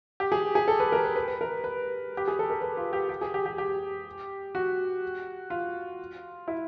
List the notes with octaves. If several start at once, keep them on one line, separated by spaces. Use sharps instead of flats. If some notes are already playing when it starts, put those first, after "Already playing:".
G4
G#4
G#4
A4
B4
A#4
B4
B4
B4
A#4
B4
G4
G#4
A4
A#4
B4
F4
G4
G4
G#4
G4
G4
G4
F#4
F4
E4